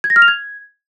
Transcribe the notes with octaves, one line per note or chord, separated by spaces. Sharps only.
G#6
A#6
F6
F7
G#6